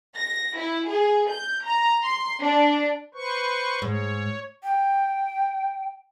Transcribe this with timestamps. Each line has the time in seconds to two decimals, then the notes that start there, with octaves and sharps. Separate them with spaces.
0.17 A#6
0.58 E4
0.89 G#4
1.30 G6
1.65 A#5
2.03 C6
2.41 D4
3.14 B4 C5 C#6
3.82 G#2 C#5
4.64 G5